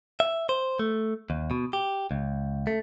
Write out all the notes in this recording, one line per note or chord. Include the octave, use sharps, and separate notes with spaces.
E5
C5
A3
D#2
B2
G4
C#2
A3